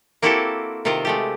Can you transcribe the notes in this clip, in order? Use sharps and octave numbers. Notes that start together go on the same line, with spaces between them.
A#3 C4 E4 F#4 G4 A4
C3 D#3 C4 F4 C5
G#3 A3 G4